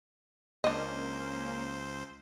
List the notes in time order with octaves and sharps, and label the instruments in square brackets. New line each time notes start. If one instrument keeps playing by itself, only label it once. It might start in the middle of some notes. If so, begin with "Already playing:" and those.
[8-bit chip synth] C#2 C5 [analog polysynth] A#3 C#4 [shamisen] D4 D#5